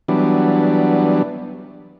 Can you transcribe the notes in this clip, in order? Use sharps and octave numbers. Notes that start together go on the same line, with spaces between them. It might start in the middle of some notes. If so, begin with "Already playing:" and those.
E3 F#3 G3 B3 D4